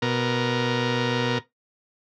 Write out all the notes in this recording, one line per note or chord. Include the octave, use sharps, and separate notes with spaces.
B2 A#4